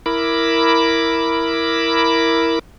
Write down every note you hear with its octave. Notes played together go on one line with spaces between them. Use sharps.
E4 A#4 B5 D6